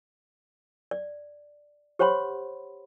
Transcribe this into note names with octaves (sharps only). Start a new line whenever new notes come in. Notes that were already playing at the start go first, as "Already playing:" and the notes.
D5
G4 C5 C#5 F#5 B5 C6